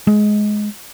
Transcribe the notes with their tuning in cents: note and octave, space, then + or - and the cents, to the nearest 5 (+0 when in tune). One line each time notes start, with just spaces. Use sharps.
G#3 +15